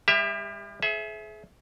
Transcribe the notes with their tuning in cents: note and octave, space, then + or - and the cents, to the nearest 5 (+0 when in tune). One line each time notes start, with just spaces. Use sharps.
G3 +45 G4 +20 E5 +0
G#4 +35 C5 -5 E5 +0